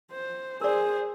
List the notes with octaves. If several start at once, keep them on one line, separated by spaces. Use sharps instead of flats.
C5
G#4 A#4 C5 D5